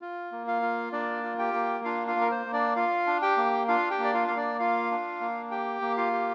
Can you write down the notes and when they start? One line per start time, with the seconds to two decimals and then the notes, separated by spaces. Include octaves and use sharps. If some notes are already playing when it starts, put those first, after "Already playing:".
0.02 F4
0.32 A#3
0.47 F4 F5
0.62 F4
0.92 A#3 D4 D5
1.23 F4
1.39 G4 G5
1.54 A#3
1.84 D4 F4 F5
2.07 F4 F5
2.16 A#3
2.21 A#4
2.31 C5
2.46 A#3
2.53 D4 D5
2.76 F4 F5
3.07 D4
3.22 G4 G5
3.37 A#3
3.68 D4 F4 F5
3.90 G4 G5
3.99 A#3
4.04 D5
4.14 F4 F5
4.27 A#3 F5
4.37 D4 D5
4.59 F4 F5
4.91 D4
5.20 A#3
5.51 G4 G5
5.82 A#3
5.97 F4 F5
6.13 G4